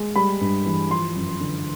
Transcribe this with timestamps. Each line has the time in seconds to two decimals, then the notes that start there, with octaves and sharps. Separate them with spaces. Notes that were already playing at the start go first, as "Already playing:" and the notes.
Already playing: G#3
0.16 G3 B5
0.41 G2
0.66 E3
0.90 F3 C6
1.15 F#2
1.40 D3